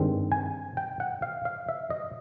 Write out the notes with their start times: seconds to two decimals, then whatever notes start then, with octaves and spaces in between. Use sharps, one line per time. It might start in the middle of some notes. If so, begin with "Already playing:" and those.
Already playing: G2 D#3 G#3 C4
0.32 G#5
0.77 G5
1.00 F#5
1.22 F5
1.45 F5
1.69 E5
1.90 D#5